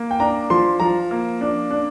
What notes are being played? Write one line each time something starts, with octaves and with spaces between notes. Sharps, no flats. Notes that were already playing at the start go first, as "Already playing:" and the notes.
Already playing: A#3
G5
D4 A#5
F3 C6
F3 A#5
A#3
D4
D4